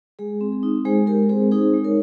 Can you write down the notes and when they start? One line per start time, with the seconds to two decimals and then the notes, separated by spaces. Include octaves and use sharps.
0.19 G#3 G#4
0.41 C4
0.52 G#4
0.63 D#4
0.85 G#3 G#4 C5
1.07 G#3 G4 A#4
1.29 C4 G#4 C5
1.51 D#4 G#4 C5
1.74 G#3
1.84 A#4 C#5